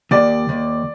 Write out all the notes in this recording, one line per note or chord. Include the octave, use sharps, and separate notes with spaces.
D#2 D5
D#2